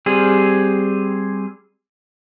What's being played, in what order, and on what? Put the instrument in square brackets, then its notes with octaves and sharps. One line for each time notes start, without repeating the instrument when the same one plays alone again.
[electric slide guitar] G3 C4 G#4